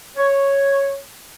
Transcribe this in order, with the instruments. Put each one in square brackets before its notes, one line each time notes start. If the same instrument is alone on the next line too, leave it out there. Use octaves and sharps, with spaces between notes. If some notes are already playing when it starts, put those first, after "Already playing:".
[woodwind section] C#5